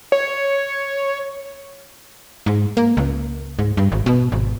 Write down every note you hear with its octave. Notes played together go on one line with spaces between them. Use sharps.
C#5
G#2
A#3
C#2
G#2
G2
G#1
B2
G#1